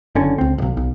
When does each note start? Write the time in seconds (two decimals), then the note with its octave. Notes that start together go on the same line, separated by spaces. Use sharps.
0.15 F#1 D3 C#4
0.38 C#2 C4
0.58 D1 B1
0.77 B1